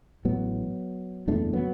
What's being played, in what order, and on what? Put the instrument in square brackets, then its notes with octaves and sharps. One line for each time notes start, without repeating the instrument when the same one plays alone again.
[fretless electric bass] A1 A2 F#3 B3
F#1 E2 B2 A3 D4
F#3 B3